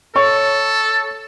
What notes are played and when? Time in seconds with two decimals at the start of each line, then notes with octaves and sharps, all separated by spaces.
0.15 A4 C#5 C#6